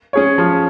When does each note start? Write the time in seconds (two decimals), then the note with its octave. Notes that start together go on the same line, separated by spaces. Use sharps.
0.13 C#4 G#4 C#5
0.38 F3